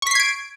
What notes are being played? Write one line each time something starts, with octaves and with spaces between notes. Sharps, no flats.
C#6 G#6 B6 C7 D7